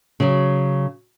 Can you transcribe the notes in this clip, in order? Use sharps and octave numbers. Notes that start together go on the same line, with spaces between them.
C#3 F#3